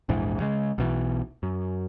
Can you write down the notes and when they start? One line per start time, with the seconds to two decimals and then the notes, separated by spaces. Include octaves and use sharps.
0.09 A#1 E2 G#2 E3
0.40 C#3 G#3
0.78 B1 B2 E3
1.43 F#2